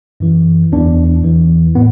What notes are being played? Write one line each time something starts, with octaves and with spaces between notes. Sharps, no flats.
F#2 E3
E2 E3 D4
E2 E3
A2 B3